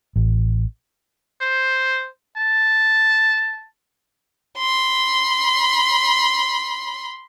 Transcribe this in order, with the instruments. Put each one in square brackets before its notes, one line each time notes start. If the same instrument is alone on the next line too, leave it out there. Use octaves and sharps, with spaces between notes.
[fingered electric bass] A1
[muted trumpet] C5
A5
[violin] B5 C6